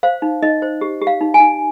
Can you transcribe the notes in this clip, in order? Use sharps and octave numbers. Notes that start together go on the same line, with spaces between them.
C5 F5
D#4
D#4 D#5
C5
G4
G4
F5
D#4
G#5
D#4